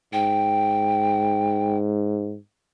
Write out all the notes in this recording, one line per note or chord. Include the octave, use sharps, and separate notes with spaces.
G#2 G5